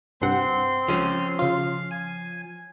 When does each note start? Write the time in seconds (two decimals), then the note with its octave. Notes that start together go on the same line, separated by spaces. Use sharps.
0.22 C2 G2 C4 F#5 C6
0.88 C#2 F3 C#4
1.39 C#3 F4 F5
1.91 G#5 D#7